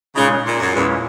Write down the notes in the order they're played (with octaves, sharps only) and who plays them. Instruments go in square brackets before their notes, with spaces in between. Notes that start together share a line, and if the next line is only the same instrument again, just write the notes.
[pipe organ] A#2 G#3 D#4 [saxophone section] C#3
[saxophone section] A#2
F#2
[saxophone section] E2 [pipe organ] A#2 G#3 C#4 E4